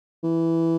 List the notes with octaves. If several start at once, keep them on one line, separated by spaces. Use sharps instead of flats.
E3